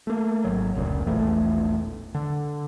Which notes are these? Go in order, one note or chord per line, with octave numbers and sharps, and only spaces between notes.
A3 A#3
G#1 F#3
F1 C#2 A#2
E1 A#1 E3 A3
D3